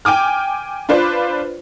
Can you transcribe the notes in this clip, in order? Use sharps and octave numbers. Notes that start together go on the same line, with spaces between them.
G5 G#5 D6 F6
D4 F4 B4 C5 D5